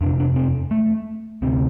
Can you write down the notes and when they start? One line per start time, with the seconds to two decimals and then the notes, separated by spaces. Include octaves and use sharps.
0.01 F2 C3 D4
0.20 D4
0.36 C4
0.71 A3
1.42 D2 C3 C4